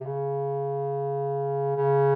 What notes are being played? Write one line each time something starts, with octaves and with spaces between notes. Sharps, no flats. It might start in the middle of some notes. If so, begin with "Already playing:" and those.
C3
C#3
C#3